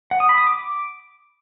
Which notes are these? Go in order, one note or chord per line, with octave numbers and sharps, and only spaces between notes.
F#5
D#6
B5
D#6
D6